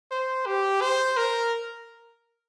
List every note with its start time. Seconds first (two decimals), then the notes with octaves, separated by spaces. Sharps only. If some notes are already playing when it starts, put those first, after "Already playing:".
0.11 C5
0.46 G4
0.81 C5
1.17 A#4